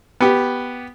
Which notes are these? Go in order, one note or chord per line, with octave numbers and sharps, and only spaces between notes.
B3 G4